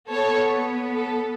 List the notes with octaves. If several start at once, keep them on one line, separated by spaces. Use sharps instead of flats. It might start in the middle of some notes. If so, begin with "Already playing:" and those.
B3 A4 C#5
A4